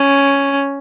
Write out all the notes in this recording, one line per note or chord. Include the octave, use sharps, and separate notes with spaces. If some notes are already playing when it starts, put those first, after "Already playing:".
Already playing: C#4